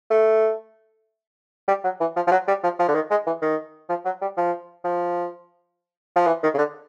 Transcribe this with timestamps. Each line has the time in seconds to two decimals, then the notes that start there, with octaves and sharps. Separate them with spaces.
0.10 A3
1.68 G3
1.84 F#3
2.01 E3
2.16 F3
2.27 F3
2.32 F#3
2.48 G3
2.64 F3
2.79 F3
2.88 D3
2.95 D#3
3.11 G#3
3.27 E3
3.42 D#3
3.89 F3
4.05 F#3
4.22 G3
4.38 F3
4.84 F3
6.16 F3
6.27 E3
6.43 D#3
6.54 C#3
6.58 D3